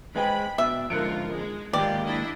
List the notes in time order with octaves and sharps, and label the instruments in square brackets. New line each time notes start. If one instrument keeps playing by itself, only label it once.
[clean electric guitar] G#3 C4 G#4 [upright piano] B4 G5 [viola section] B5
[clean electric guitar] B2 [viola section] D4 [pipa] E5
[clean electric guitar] G#2 D3 F3 [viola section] F4 A#4 [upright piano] F#6 C#7 D7
[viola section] G#3
[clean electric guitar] D#2 G#2 A#3 [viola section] F4 G4 [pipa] D5 [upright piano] G5
[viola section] D4 E4 D#5